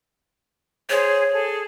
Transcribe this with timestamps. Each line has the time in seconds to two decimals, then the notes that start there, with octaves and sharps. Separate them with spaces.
0.90 G#4 C5 C#5
1.31 G#4 A4